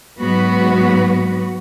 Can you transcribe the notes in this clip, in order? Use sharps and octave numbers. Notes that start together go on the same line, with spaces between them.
G#2 F#3 B3 F#4 B4